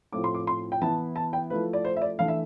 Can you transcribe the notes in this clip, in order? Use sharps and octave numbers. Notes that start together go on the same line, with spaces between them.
A2 F3 C4 E4 D6
C6
D6
C6
G5
E3 B3 E4 A5
A5
G5
F3 A3 E4 B4
D5
C5
E5
D5
E3 A3 D4 F5
E5